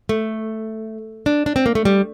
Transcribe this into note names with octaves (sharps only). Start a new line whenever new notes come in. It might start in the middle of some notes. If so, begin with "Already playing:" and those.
A3
D4
D4
C4
A#3
A3
G3